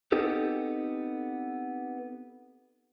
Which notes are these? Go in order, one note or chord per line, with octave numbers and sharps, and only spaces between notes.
B3 C4 D#4 G4 A4